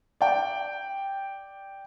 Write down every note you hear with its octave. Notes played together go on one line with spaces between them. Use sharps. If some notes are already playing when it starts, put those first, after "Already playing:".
D5 G5